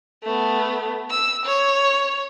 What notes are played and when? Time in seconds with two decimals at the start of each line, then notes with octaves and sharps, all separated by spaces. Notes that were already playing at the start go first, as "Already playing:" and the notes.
0.24 A3 B3
1.10 E6
1.45 C#5